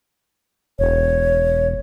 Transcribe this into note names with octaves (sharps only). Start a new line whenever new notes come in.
E1 C#5